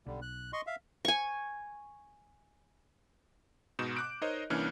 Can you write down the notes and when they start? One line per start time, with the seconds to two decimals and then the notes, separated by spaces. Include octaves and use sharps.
0.06 B1 D3 G3
0.22 F#6
0.53 D#5 C6 C#6
0.67 E5 F5
1.05 G#5 C#6
3.79 G#2 B2 G6 E7
3.97 D6 F#6 D7
4.22 D#4 A#4 C5 C#5 D#5
4.50 C2 E3 A#3 C#4 D4 F6